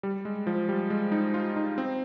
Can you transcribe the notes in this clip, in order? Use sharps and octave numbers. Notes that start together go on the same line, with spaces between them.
G3
G#3
F3
G3
G#3
D#4
F4
D#4
C4